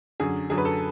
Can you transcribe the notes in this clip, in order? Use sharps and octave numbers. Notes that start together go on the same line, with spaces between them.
F#2 D3 F#3 G#4
F#2 D3 F#3 G#4
B4
A4